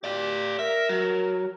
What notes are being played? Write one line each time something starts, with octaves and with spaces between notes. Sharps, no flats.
G4 D5 F5
A#4 E5
F#3